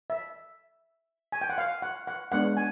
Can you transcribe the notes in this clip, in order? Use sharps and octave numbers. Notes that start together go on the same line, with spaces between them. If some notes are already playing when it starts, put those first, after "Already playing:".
E5
G#5
G5
F#5
F5
F#5
F#5
G#3 B3 D4 F#5
G#5